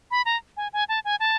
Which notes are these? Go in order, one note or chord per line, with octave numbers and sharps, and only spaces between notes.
B5
A#5
G#5
G#5
A5
G#5
A5